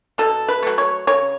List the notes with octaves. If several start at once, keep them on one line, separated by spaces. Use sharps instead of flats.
B2 A4
B4
F#3 A3
C#5
C#3 C#5